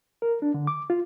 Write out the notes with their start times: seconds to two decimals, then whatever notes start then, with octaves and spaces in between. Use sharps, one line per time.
0.22 A#4
0.42 D4
0.54 D3
0.67 D6
0.90 F4